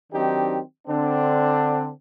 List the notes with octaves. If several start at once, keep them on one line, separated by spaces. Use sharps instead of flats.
D#3 F#3 C4 D4 D#4 G4
D3 C4 D4